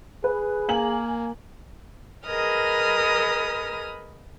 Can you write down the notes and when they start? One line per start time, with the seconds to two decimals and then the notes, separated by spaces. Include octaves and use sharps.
0.24 G#4 B4
0.69 A#3 G#5 F#7
2.25 G#4 A#4 B4 D#5 D#6 F6